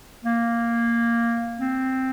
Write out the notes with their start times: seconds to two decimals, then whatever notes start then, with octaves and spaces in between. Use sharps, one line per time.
0.24 A#3
1.59 C4